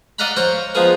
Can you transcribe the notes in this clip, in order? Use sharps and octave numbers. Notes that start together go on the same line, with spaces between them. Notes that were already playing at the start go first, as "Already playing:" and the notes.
D5 D#5 F5 F#5 A#5 B5
C5 C#5 F5 A#5 C#6 D6
F3 G#3 B3 G#4 A#4